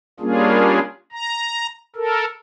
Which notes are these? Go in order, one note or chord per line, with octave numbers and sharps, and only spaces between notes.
G3 A#3 C#4 D4 F4 G#4
A#5
A4 A#4